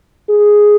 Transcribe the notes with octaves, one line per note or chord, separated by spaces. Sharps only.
G#4